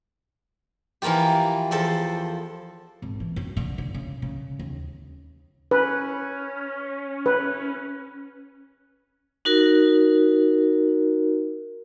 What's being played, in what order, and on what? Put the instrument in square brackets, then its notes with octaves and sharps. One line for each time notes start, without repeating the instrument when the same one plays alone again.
[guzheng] E3 F3 A#3 F4 G4
E2 F3 A4 C5
[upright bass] G#1
E3
F#2
D3
D3
C#3
C#3
D#2
[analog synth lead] C#4 [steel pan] B4
[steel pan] B4
[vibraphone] D#4 F#4 A#4